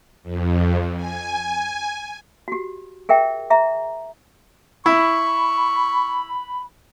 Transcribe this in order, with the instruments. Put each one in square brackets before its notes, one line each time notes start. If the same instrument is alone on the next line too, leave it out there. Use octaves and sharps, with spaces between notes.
[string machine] F2
G#5
[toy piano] F#4 G4
G#4 A#4 E5 G5
G#4 E5 A#5
[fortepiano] E4 [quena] B5 [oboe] C#6